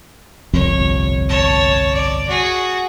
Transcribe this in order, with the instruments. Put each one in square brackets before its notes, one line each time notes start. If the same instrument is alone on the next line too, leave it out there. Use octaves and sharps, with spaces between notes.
[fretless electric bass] G1 C2 F2 [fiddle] C#5
[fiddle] C#5 A5
D5
F#4 G#4